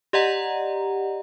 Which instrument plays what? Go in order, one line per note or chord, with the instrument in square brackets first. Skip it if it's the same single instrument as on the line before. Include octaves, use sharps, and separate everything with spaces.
[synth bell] G4 D5 D#5 F#5 A#5